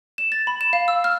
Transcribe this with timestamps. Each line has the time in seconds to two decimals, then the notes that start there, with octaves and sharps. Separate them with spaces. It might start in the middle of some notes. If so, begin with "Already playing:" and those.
0.18 E7
0.32 A6
0.47 B5
0.61 E7
0.73 F5
0.88 E6
1.04 F6